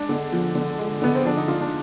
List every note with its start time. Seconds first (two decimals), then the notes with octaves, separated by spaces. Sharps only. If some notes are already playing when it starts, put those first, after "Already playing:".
Already playing: G#3 D4
0.09 D3
0.32 F3
0.55 D3
0.78 G#3
1.02 D3 B3
1.15 C4
1.25 F3 D4
1.37 D#4
1.48 D3 F4
1.61 D4